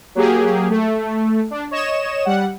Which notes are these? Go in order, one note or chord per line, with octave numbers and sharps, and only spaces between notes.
F#3 A#3 G4 G#4
A3
D4
C#5 D#5 E7
G3 F#5